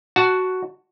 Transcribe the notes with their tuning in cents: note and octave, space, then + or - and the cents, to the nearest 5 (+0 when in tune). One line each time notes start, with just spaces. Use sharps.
F#4 +5 F#5 +0 A5 +0